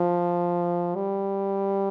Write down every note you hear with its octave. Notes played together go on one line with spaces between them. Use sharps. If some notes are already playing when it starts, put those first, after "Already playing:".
Already playing: F3
G3